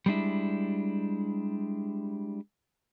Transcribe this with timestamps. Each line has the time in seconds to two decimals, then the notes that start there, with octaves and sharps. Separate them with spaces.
0.06 G3 G#3 D4 E4